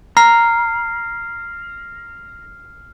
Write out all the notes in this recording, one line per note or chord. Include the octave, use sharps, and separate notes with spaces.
A#5 F6 C7